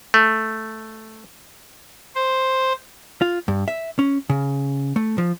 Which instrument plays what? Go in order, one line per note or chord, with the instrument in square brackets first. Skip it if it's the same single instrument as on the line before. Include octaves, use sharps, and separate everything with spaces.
[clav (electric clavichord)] A3
[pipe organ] C5
[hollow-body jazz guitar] F4
G2
E5
C#4
C#3
A3
F3